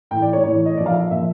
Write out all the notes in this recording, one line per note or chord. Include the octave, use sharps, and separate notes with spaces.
A2 E3 G5
D5
C#5
A2 E3 C#5
D#5
A#2 F3 D5
F5
E5
A#2 F3 E5